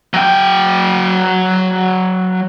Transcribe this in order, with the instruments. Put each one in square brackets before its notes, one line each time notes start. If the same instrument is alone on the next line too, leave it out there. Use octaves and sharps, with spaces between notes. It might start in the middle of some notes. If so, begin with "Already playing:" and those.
[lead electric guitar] F#3 G5